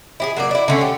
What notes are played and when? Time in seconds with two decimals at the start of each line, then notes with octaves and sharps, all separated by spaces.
0.20 E4 G4 G#4
0.37 F#3 A#3 D5
0.51 E4 D5
0.68 D3 A3 C#4
0.81 G4